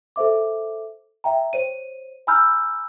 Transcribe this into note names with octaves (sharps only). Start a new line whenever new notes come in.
A4 C5 E5 D6
E5 G5 A#5
C5 C#5 D#7
G#5 A#5 B5 E6 F6 G6